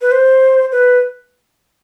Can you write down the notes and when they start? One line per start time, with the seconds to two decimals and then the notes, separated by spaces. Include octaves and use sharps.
0.02 B4
0.11 C5
0.72 B4